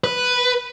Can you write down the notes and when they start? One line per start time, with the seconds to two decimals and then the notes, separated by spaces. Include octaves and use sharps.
0.04 B4